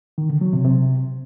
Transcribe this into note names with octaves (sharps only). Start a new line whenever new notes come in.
D#3
D3
F#3
C3
C3